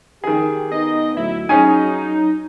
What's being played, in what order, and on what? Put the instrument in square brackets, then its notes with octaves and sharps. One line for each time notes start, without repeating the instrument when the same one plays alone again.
[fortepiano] D#3 G#4 [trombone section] G4
[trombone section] B3 D#4 [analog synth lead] D#5
[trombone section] D2 A2 F#3 [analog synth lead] E4
[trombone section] F#3 [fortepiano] C#4 G#4 G#5 [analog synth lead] D#4